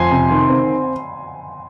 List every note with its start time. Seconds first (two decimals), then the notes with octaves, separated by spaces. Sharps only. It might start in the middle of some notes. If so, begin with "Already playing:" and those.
Already playing: F2 G#5 C6
0.12 C3
0.31 D#3
0.50 C4